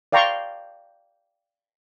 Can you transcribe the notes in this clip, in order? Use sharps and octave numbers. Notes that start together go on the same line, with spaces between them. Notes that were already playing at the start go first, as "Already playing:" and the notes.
D5 F5 G5 A#5 C6 C#6